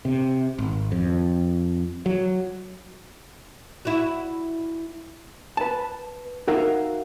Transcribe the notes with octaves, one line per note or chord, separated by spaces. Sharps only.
C3
G#1
F2
F#3
E4 F#4
B4 A5
D#4 F#4 A#4 E5 F5 A#5